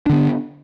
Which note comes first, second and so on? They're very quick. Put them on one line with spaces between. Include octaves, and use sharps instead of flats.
D4 D3 B3